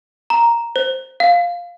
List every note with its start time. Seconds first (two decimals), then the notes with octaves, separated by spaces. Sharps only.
0.30 A#5
0.76 C5
1.20 F5